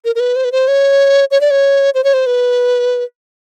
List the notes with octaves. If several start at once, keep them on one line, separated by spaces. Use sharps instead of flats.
A#4
A#4
B4
C5
B4
C5
C#5
C#5
D5
C#5
C5
C#5
C5
B4